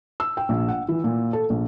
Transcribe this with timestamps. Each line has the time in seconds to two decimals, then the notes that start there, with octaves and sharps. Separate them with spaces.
0.20 E6
0.37 G5
0.49 A#1
0.68 F#5
0.89 E3
1.04 A#2
1.33 A4
1.50 A#1